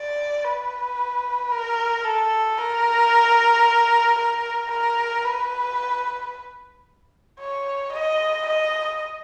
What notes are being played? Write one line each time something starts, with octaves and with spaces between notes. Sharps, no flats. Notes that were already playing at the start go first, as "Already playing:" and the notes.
Already playing: D5
B4
A#4
A4
A#4
A#4
A#4
B4
C#5
D#5
D#5